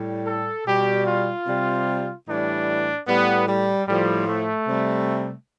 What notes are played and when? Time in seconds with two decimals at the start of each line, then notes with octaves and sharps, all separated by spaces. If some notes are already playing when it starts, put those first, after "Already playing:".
Already playing: A2 G3
0.26 A4
0.66 B2 G3 G4
1.07 F4
1.46 C3 G3
2.27 A2 E3 G3 D4
3.07 A2 G3 B3
3.47 G3
3.87 A2 F3 G3
4.28 A3
4.67 C3 G3